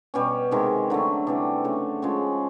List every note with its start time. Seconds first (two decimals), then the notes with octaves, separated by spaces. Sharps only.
0.14 B2 G3 C#4
0.51 C3 D#3 G#3
0.90 D3 F#3 A3
1.27 C3 E3 G3 D4
1.64 C#3 F#3 A3
2.02 C#3 F3 G#3 C#4